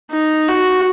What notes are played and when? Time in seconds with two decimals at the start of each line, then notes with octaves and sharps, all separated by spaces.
0.11 D#4
0.48 F#4